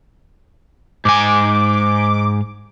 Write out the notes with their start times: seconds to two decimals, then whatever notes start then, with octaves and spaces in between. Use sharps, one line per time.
1.05 G#2 G#5 D6